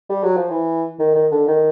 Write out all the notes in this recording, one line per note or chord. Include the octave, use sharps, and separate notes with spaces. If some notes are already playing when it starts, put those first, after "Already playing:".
G3
F#3
F3
E3
D#3
D#3
D3
D#3